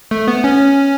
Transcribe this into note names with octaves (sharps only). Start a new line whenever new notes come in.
A3
B3
C#4